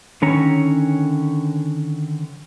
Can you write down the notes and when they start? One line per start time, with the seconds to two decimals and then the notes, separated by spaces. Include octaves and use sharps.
0.22 D3 D#3 C#4 C#5 A#5